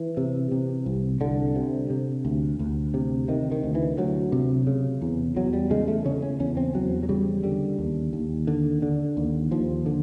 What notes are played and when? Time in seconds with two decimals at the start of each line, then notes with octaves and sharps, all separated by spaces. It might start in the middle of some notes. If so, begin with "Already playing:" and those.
Already playing: E3
0.17 C3
0.52 C3
0.86 C2
1.21 C2 D3
1.55 C3
1.90 C3
2.25 D2
2.59 D2
2.94 C3
3.28 C3 D#3
3.52 D#3
3.63 D2
3.75 E3
3.98 D2 F#3
4.32 C3
4.67 C#3
5.02 E2
5.36 E2 F#3
5.53 G3
5.71 C#3 G#3
5.88 A3
6.05 C#3 C#4
6.22 C#4
6.40 E2 C#4
6.57 C4
6.75 E2 F#3
7.03 F#3
7.09 C#3 G3
7.43 D3 G3
7.78 D#2
8.13 D#2
8.47 D3
8.82 D3
9.17 D#2
9.51 D#2 F3
9.86 D3